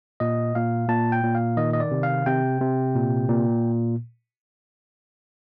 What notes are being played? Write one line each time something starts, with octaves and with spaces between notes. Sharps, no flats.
A#2 D#5
A#2 F5
A#2 A5
G5
A#2
F5
D#3 D#5
D#5
D5
C3
F5
C3 G5
C3
A#2
A#2